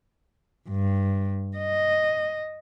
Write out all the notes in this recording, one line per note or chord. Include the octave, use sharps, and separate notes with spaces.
G2
D#5